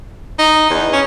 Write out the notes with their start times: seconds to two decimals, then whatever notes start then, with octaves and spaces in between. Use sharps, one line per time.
0.39 D#4
0.70 E2
0.93 C#4